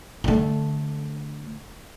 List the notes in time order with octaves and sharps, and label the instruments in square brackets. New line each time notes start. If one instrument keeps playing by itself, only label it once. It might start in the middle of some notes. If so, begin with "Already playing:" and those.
[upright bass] D3 A3